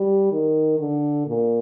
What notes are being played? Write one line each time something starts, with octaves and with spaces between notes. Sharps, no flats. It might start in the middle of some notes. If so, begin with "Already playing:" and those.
Already playing: G3
D#3
D3
A#2